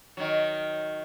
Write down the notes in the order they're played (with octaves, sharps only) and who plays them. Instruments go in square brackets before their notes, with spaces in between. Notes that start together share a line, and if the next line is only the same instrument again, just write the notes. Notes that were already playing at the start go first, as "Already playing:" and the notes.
[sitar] D#3 F#3